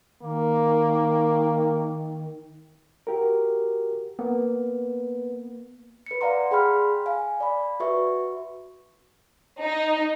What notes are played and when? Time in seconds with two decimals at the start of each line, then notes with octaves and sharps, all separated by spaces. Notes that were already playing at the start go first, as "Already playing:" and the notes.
0.22 D#3 A#3
3.07 F#4 G4 A#4
4.19 A#3 B3
6.06 B4 C#7
6.21 D5 F5 F#5 A#5 C6
6.51 G#4 G5 B5 C6 F6
7.06 F5 G#5
7.40 D5 B5
7.80 F#4 B4 E5 C#6
9.60 D#4